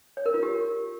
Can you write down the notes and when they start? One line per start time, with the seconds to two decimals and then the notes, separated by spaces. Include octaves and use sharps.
0.17 C#5
0.26 A#4
0.34 F4
0.43 G4